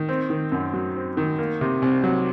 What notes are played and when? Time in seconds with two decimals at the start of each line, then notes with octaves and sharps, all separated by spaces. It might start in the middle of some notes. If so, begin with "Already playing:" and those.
Already playing: D#3
0.09 C4
0.30 D#3
0.52 F#2
0.73 F#3
0.96 C4
1.17 D#3
1.39 A#3
1.61 C3
1.82 C2
2.03 F#3